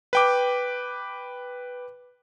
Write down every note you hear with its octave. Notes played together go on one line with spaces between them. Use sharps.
B4 G5 D6